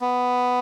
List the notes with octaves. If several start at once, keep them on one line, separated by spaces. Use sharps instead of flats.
B3